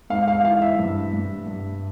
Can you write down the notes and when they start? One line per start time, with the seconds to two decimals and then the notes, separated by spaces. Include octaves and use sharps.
0.10 G#2 F5
0.28 F5
0.45 E3 F5
0.62 E5
0.79 G2
1.13 G2
1.47 G2